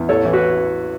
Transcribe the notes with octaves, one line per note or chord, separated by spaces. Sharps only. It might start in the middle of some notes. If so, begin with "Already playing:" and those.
Already playing: E2
A1 A4 C#5
E3
F#4 B4